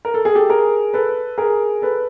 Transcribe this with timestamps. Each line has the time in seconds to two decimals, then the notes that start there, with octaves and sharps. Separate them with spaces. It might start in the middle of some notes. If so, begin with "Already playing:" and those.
0.05 A#4
0.14 A4
0.25 G#4
0.35 G4 A4
0.49 G#4 A#4
0.93 A4 B4
1.38 G#4 A#4
1.82 A4 B4